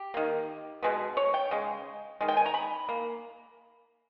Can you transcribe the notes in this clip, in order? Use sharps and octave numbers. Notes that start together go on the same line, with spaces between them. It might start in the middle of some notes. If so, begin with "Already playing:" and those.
Already playing: G4
D#3 A#3
B2 G#3 B3
C#5
G5
C#3 G#3
D#3 G#3
G5
G#5
A#5
B5
A#3